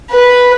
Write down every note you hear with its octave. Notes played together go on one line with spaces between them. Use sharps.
B4